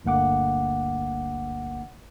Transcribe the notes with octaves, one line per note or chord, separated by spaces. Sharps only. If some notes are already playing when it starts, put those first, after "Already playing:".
G1 D2 A#3 F#5 D6